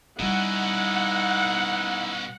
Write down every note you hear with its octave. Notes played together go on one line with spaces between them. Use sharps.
B2 G3 C#4 D#4 E4 F#5